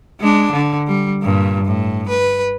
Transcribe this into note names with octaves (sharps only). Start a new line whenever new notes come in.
G#3 D4
D3
G3
G2 A#2
A2
B4